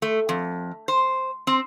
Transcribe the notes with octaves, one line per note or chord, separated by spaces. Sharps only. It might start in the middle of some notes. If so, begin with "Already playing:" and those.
A3
F2
C5
C4